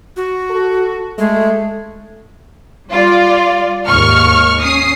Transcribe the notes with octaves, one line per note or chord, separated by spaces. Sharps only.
F#4
A4
G#3 A3
G3 F4 D5
D#2 G#2 C#6 F6
C#4 D#6 C7